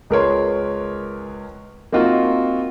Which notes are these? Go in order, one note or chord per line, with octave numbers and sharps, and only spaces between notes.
C#2 G#4 A#4 B4 C#5 C6
A#3 C4 D#4 F4 F#4